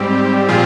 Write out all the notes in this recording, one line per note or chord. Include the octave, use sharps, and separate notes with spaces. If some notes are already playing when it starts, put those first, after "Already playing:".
Already playing: G#2 G3 C4 G4
A#2 F3 C4 F4 G#4